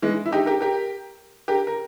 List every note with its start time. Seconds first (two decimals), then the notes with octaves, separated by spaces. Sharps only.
0.02 E3 G#3
0.26 E4
0.32 D#4 G4
0.46 G4 A#4
0.61 G4 A#4
1.48 G4 A#4
1.67 A#4